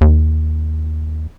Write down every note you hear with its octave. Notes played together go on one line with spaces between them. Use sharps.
D#2